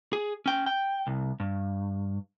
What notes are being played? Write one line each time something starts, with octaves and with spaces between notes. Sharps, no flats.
G#4
C#4 G5
G5
C2
G2